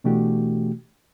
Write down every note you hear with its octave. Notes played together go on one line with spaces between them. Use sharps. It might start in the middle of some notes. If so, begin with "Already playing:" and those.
B2 E3 A3 D4 F#4 G4